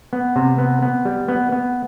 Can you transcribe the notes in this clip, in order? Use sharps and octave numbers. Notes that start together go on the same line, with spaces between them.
B3
C3
B3
B3
G3
B3
B3